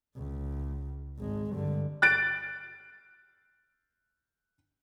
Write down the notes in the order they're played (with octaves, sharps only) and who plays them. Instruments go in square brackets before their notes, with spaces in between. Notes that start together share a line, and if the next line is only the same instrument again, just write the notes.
[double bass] C#2
G#1 G#3
G2 D3
[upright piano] F#6 A6 D7